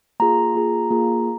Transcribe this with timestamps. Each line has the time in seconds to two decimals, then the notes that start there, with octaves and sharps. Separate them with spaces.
0.20 A#3 F4 G#4 A#5
0.55 A#3 F4 G#4
0.91 A#3 F4 G#4